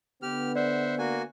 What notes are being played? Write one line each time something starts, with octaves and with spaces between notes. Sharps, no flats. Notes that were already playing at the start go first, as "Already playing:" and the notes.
D3 B3 G4 F6
C5 D5 E5 F#5
A#3 F#4 G#5